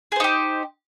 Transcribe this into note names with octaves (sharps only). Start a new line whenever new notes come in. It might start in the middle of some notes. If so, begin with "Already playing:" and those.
D#4 G4 G#4 C5